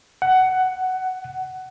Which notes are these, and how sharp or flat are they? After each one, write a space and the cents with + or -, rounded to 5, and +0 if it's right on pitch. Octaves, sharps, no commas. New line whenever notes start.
F#5 +15